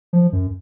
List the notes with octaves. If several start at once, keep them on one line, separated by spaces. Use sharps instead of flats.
F3
F#2